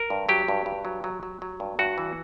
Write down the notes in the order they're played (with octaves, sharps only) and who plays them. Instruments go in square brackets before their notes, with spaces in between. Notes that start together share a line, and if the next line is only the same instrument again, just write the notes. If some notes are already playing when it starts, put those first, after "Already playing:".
Already playing: [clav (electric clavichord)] A#4
G2
F#3 G4
G2
G2
F#3
F#3
F#3
F#3
G2
G2 F#4
E3